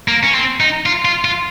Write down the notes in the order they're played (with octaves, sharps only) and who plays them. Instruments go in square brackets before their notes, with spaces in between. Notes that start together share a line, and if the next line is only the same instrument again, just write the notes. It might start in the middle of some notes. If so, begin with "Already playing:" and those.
[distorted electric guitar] A#3
C#4
C4
D#4
F4
F4
F4